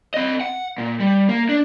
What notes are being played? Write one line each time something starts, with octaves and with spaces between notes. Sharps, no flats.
C4 D#5
F#5
A#2
G3
A#3
D4